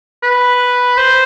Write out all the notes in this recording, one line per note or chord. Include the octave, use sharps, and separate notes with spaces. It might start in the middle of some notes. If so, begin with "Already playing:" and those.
B4
C5